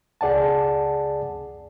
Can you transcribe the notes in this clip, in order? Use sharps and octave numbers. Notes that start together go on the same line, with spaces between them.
C#2 G#4 D5 F#5 A5